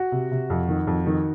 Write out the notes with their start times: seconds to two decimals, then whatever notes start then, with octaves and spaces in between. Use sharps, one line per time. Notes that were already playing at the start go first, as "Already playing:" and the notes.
Already playing: F#4
0.12 C3
0.31 C3
0.50 F2
0.68 D#3
0.87 F2
1.06 D#3